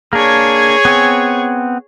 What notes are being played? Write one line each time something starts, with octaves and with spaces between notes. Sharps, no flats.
A#3 D4 G#4 C#5
B3 C4 G#5